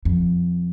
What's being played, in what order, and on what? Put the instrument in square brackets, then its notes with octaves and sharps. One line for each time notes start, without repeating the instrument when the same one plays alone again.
[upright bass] F2